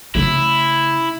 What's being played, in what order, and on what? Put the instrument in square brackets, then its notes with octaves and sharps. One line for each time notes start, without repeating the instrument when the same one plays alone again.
[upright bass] C#3 A3 [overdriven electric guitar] E4